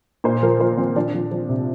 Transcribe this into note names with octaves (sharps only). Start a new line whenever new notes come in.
A#2 C5
F3 A#4
F3 C5
F3 C4
F3 D4
F3
F3
C3